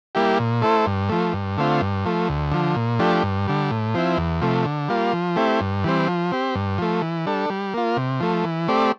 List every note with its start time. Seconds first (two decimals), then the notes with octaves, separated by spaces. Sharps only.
0.15 G3 A#3 E4 G4
0.39 A#2
0.62 A3 E4 A4 C5
0.86 G2
1.09 F3 A3
1.33 G2
1.57 D3 A3 C4 F4
1.81 G2
2.05 F3 A3
2.29 D2
2.52 D3 F3
2.76 A#2
2.99 F3 A3 D4 G4
3.23 G2
3.47 D3 G3
3.71 A2
3.94 F3 C4 E4
4.17 E2
4.41 C3 F3 A3
4.65 D3
4.89 G3 A#3 F4
5.13 F3
5.36 A3 C4 E4 G4
5.61 G2
5.84 E3 G3 C4
6.08 F3
6.32 C4 G4
6.55 G2
6.78 F3 A3
7.02 E3
7.26 G3 D4 A4
7.50 G3
7.74 A#3 F4
7.97 C3
8.20 F3 A3
8.44 E3
8.68 A3 C4 G4 D5